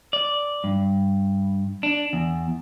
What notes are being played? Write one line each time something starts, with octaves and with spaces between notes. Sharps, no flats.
D5
G2
D4
E2